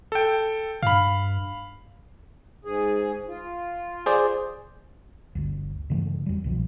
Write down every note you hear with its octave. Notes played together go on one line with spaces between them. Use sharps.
A4 G5
G2 F5 B5
G#2 G#4
F4
G#4 C5 D5
G1 D2
G2 C#3 E3 A3
F2 G3
C2 B2 D3 F3